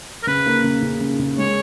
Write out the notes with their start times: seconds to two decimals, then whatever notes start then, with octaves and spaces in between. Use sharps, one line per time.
0.23 A#4
0.27 C#3 B4
0.46 A#3
0.64 C#3
0.82 C#3
1.01 C#3
1.19 C#3
1.38 G#3 C#5